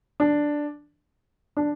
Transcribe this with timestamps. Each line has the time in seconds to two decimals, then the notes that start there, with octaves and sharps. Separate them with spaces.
0.20 D4
1.57 D4